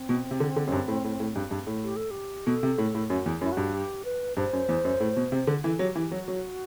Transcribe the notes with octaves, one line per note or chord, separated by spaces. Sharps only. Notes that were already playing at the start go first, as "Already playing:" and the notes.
Already playing: C4
B2
C3
D3
D3
F#2
G2
A2
A2
A2
G2
G2
A2
G4
A4
G4
B2 A4
C3
A2
A2
F#2 F#4
E2
F#2 E4
G2 F#4
G4
B4
G2 C5
F#2
E2
F#2
A2
B2
C3
D3
E3 A4
F#3 G4
E3 G4
F#3 F#4
F#3